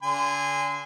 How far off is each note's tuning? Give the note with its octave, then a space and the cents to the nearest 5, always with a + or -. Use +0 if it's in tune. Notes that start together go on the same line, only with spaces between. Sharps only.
D3 -35 G#5 -25 C6 -25